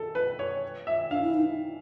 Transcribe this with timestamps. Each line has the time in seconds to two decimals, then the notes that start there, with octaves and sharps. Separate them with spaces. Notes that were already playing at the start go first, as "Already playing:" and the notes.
Already playing: A4
0.15 B4
0.39 C#5
0.87 E5
1.11 D4 F5
1.22 E4
1.34 D#4